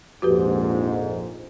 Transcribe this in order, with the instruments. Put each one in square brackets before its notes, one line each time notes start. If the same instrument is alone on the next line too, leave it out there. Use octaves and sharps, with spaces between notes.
[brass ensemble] A#1 F2 G#2 [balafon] F#4 G4 B4